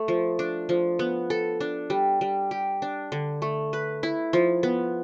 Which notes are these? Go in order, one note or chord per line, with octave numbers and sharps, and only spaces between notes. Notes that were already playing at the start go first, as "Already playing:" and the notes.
Already playing: A3
F3
D4
F3
B3
A4
D4
G3
G3
G4
D4
D3
A3
B4
E4
F3
B3